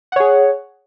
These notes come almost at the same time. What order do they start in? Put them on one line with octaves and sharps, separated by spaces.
F#5 C#5 G#4